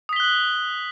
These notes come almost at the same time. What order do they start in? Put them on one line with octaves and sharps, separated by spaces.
D#6 B6 G7 F#6 F#7